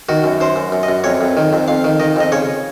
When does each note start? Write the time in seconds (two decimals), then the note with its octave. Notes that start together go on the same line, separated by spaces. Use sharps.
0.09 D#3 F#4
0.24 F#2
0.41 F#2 C5
0.56 F#2
0.72 F#2
0.83 D#5
0.89 F#2
1.04 F2 C#5
1.21 F2
1.37 D#3
1.53 F2
1.68 F2 F5
1.84 D#3
2.00 D#3 D#5
2.16 F2 D#5
2.32 C#3 C#5